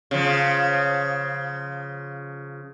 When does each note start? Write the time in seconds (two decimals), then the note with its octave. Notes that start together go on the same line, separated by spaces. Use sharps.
0.11 C#3 F3